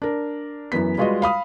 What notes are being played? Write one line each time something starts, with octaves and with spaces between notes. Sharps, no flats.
D4 A#4
F#2 E3 B3 B6
G3 G#3 F4 F#4 B4 D#5
F5 B5 D#6